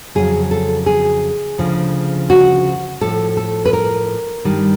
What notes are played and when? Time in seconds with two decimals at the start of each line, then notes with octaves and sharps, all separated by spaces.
0.15 F2 C#3 F#3 G#4
0.51 A4
0.86 G#4
1.58 D2 C#3 F3
2.30 F#4
3.01 A2 F3 A4
3.37 A4
3.65 B4
3.73 A#4
4.44 G2 D#3 G3